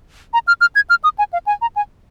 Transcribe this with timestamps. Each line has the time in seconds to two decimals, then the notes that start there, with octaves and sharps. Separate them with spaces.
0.34 A#5
0.48 F6
0.61 F6
0.75 G#6
0.90 F6
1.04 D#6
1.19 G#5
1.33 F5
1.47 G#5
1.62 A#5
1.76 G#5